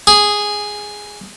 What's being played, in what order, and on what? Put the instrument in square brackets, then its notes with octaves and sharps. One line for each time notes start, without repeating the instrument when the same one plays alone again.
[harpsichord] G#4